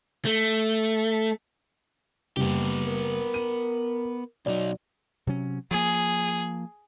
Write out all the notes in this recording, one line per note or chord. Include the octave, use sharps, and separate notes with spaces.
A3
F#1 G3 B3 G4
A#4
D#7
B1 F#3 D#4 D5
C3 F#3 C#4
F3 A#3 G#4